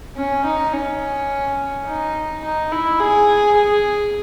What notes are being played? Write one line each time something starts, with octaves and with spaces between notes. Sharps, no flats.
C#4
D#4
C#4
D#4
D#4
E4
G#4
G#4